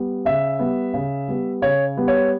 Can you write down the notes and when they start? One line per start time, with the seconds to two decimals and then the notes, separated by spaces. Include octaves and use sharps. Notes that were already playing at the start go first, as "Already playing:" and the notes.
Already playing: G3 B3
0.25 C#3 E5
0.59 G3 B3
0.94 C#3
1.28 G3 B3
1.62 C#3 C#5
1.97 G3 B3
2.08 C#5